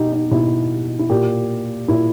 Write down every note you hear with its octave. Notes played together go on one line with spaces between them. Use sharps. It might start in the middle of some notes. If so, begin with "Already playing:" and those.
Already playing: B2 D#4 G4
D#4
B2 E4
E4
A#2 G4
A#2 E4